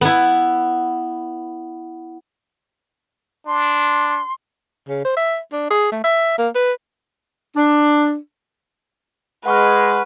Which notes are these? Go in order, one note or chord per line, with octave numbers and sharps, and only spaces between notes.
B3 E4
D4 C6
C#3
C5
E5
D4
G#4
A3
E5
A#3
B4
D4
G#3 B4 F#5 C#6 F6